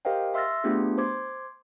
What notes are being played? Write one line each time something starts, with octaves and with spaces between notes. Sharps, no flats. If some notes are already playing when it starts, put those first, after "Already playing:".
G4 A#4 C5 D#5 F5 G5
E5 C6 E6 F6 A6 A#6
A3 B3 D4 F4 G4 G#4
C5 C6 D6 G#6